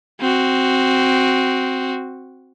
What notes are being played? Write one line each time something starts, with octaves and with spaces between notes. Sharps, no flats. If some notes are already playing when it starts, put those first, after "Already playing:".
C4 F#4